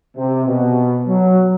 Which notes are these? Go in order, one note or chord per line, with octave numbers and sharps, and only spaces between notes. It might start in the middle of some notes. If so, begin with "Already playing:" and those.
C3
B2
F#3